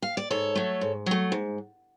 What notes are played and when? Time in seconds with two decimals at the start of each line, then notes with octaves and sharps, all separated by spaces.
0.02 F5
0.17 D5
0.30 G#2 A4 C#5
0.55 F#3 A3
0.81 G#2
1.06 F#3 A3
1.32 G#2